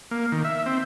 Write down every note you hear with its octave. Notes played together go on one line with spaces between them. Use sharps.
A#3
D#3
E5
C4